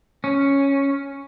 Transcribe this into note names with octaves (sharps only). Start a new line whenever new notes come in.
C#4